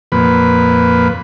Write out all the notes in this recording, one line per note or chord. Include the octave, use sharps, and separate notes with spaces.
F2 A#2 B4